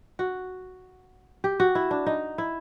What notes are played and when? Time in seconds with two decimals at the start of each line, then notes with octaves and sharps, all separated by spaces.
0.19 F#4
1.44 G4
1.60 F#4
1.75 E4
1.91 D4
2.06 D#4
2.38 E4